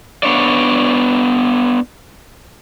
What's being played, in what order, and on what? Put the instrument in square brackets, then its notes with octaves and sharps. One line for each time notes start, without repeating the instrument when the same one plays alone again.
[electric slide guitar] B3 D4 C#5 D5